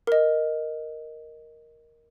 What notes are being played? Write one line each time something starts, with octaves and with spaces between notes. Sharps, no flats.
A#4 D#5